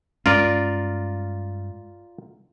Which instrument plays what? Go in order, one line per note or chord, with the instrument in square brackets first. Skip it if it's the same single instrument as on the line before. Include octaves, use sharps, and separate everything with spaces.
[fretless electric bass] G2 G#3 C#4 [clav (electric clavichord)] F4 A#4 D5